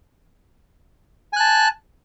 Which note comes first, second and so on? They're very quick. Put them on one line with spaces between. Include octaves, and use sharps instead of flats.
G#5 F#6 A5